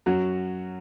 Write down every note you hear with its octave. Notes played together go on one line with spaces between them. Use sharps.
F#2 F#3 C#4 F#4